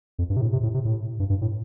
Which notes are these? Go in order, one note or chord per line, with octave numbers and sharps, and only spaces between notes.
F2
G2
C3
A2
C3
A2
C3
A2
G2
G2
A2